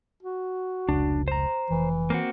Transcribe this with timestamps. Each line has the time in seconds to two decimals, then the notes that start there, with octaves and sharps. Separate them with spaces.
0.23 F#4
0.89 F1 C#2 D4
1.28 C5 A#5
1.70 F1 E3
2.10 A#3 C4 F#4